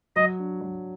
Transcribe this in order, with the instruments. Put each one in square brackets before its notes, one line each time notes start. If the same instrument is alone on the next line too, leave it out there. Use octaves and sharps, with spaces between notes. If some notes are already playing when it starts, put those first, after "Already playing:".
[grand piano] F#3 [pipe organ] D#5
[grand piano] D4
F#3